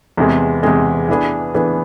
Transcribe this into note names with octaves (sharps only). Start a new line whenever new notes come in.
E2 C3 G#3
E2 C3 G#3
E3 B3 D4 G#4
E3 B3 D4 G#4